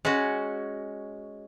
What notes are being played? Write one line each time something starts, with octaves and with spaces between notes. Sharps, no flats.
G#3 C#4 F#4